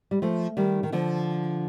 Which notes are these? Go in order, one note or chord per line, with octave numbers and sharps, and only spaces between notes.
G3
F3 A3
D#3 G3
D#3
D3 F3